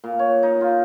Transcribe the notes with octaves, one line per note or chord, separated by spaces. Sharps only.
A#2
C#5
D#4
F4